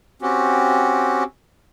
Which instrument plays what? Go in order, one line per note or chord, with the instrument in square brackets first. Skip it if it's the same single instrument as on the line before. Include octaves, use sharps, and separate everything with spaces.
[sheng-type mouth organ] C4 C#4 F#4 G4